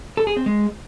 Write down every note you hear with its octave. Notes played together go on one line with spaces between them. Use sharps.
A4
G#4
C4
G#3